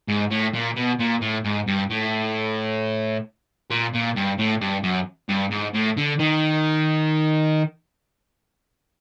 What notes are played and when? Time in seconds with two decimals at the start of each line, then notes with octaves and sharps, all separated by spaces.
0.08 G#2
0.31 A2
0.54 A#2
0.76 B2
1.00 A#2
1.21 A2
1.44 G#2
1.67 G2
1.90 A2
3.70 A#2
3.93 A#2
4.16 G2
4.38 A2
4.61 G2
4.83 F#2
5.29 G2
5.51 G#2
5.74 A2
5.97 D3
6.19 D#3